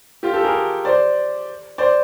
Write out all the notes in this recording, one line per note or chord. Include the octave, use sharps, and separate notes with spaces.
F4 G4
G4 A4
G#4 A#4
C5 D5
C5 D5